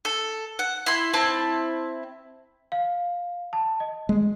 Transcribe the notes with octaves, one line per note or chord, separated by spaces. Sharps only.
A4
F#5
E4 C6
C4 E4 A5
F5
A5
D#5
G#3